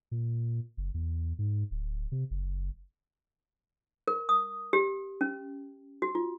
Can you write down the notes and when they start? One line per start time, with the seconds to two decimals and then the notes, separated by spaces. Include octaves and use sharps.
0.11 A#2
0.77 F#1
0.94 E2
1.39 G#2
1.71 D1
2.12 C3
2.31 F#1
4.08 A#4
4.29 D#6
4.73 G4
5.21 C#4
6.02 F#4
6.15 F4